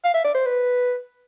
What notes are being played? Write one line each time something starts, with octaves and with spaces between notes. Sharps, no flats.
F5
E5
D5
C5
B4